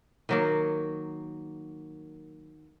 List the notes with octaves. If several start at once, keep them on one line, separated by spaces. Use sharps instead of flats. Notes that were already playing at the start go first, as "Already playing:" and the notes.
D#3 F#3 A#3